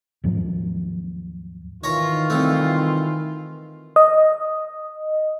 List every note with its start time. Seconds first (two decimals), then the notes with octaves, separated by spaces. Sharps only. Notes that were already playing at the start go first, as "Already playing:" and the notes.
0.24 D#2 G#2 F3 F#3
1.84 D#3 E3 F4 C#5 A#5
2.30 C2 A3
3.96 D#5